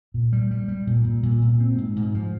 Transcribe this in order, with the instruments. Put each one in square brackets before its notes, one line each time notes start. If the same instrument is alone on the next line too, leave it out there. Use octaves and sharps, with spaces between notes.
[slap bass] A#2
G3
G3
G3
A#2
A#2
A#2
A#2
C4
G#2
G#2
F3